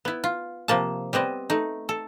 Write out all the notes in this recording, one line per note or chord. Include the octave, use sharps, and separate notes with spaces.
B3 E4
F4
C3 F3 A#3 A5
G3 B3 C4 D#5
A3 D#4
A4